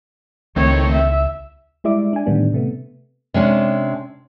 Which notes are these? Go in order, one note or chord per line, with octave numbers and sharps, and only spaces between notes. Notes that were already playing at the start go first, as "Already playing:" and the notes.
C#2 D#3 A3 C4 C#5
E5
G3 G#3 E4 D5 E5 D6
D4 G#5
A2 D3 D#3 G3 B3 D4
C3 A3 B3
C3 G#3 C#4 D4